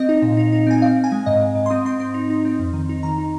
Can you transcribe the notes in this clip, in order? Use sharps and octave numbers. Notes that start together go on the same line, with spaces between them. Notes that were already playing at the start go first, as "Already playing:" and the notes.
Already playing: C4 D#5
D#4
A#2
D#4
D#4
C4 G#5
C4 F5
C4
G#5
G#3
G#2 D#5
G#2
G#2
C6
C4 D#6
C4 C6
C4 C6
D#4
D#4
C4
F2
D#3
D#4
D#3 A#5
D#4